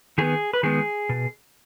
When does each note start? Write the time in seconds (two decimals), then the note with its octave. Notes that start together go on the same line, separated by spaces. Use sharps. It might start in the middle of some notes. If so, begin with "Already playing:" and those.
0.18 D#3 B3 G#4
0.53 B4
0.63 D#3 G#3 B3 G#4
1.09 B2